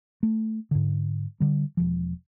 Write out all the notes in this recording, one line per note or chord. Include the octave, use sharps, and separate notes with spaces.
A3
G#2 D3
D3 G3
E1 F3